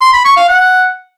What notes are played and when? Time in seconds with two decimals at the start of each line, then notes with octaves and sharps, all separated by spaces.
0.01 C6
0.13 B5
0.25 C#6
0.37 F5
0.49 F#5